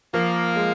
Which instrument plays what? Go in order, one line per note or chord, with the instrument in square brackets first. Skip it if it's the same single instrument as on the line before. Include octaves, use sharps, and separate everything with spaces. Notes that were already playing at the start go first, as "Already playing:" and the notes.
[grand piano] F3 [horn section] A#3
[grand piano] G#3